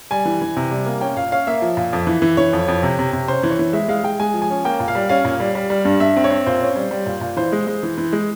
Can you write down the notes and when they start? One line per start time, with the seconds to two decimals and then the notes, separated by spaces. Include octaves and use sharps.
0.11 G3 G#5
0.25 E3
0.42 E3
0.57 C3
0.72 G3
0.86 A#3
1.01 C#4 G5
1.17 A#2 F5
1.32 C#4 F5
1.47 A#3 E5
1.62 F3
1.77 A#2
1.93 F2
2.07 E3
2.22 E3
2.37 E3 C#5
2.53 F2
2.68 F2
2.83 C3
2.99 C3
3.13 C3
3.28 C#4 C5
3.43 E3
3.51 C#5
3.59 E3
3.73 G#3 E5
3.88 G#3 F5
4.03 G#3 G5
4.20 G#3 G#5
4.34 F3
4.42 G#5
4.50 C#4
4.65 A#3 G5
4.80 A#2
4.88 F5
4.95 G3
5.09 C#4 F5
5.25 A#2
5.40 G3
5.55 G3
5.70 G3
5.85 G2
6.00 G2 E5
6.17 C4
6.24 C#5
6.31 C4
6.46 A#2 C5
6.62 C#4
6.76 G3
6.91 G3
7.06 A#2
7.21 A#2
7.37 E3 C5
7.52 G#3
7.67 G#3
7.83 E3
7.98 E3
8.13 G#3